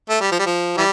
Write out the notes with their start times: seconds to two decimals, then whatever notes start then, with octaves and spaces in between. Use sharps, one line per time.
0.09 A3
0.20 G3
0.32 F3
0.39 G3
0.46 F3
0.77 E3 G3